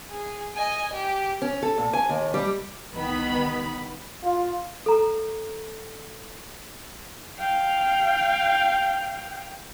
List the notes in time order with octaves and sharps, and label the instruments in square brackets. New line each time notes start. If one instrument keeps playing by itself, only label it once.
[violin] G#4
D#5 G#5
G4
[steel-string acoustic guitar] C#4
A4
A#2
G#5
D#2
G3
[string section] C2 D#3 B3 B5
[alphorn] F4
[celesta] A4 A#5
[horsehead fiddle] F5 G5